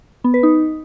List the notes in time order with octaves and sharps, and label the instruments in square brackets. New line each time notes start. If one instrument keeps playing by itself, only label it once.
[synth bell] B3
B4
D#4